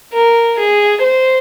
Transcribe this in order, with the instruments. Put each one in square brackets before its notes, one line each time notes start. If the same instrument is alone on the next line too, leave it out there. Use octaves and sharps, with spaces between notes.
[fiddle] A#4
G#4
C5